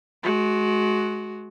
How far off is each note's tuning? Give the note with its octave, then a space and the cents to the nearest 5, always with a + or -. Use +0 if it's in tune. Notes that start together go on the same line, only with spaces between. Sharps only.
G#3 +30 F#4 +0